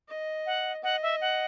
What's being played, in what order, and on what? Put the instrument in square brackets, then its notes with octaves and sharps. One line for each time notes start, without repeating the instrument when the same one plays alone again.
[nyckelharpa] D#5
[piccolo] F#5
[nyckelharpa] D#5 [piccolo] F#5
[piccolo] E5
F#5